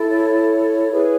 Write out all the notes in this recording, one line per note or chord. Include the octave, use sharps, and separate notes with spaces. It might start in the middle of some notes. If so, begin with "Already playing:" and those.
Already playing: E4 A4
C#5
E4 G#4 B4